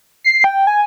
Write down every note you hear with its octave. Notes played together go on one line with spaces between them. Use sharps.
C7
G5
G#5